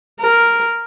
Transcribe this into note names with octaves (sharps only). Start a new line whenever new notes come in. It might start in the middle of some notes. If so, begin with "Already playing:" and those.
A#4